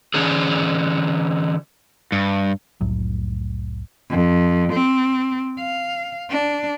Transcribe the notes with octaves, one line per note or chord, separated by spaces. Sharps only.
D3 E3 C#4 D4 G#4
G2
F1 C2 A2 F#3
F2
C4
F5
D4